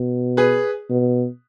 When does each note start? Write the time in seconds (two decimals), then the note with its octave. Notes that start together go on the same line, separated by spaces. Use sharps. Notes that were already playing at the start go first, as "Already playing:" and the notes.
Already playing: B2
0.37 G#4 B4
0.90 B2